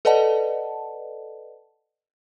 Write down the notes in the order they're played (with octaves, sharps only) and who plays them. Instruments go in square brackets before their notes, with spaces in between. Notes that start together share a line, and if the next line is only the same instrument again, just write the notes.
[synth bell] A4 B4 D5 D#5 F#5 A5